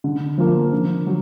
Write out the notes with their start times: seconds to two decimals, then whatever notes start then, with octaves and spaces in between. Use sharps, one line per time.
0.04 D3
0.38 F3 A#3
0.73 D3
1.07 F#3